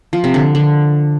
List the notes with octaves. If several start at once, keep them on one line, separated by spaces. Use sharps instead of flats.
F3
C3
D3
D3